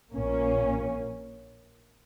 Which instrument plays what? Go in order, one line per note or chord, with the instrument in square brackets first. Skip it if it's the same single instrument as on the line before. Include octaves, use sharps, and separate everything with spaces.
[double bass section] A#1 A#2 A#3 C#4